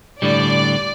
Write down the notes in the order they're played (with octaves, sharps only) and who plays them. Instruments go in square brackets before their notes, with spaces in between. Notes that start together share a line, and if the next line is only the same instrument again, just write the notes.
[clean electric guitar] A2 D3 G3 [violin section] D5